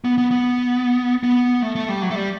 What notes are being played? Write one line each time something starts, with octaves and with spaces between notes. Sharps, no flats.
B3
B3
B3
B3
A3
A3
G3
F#3
A3
G3